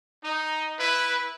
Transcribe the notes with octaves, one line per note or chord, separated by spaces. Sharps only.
D#4
E4 B4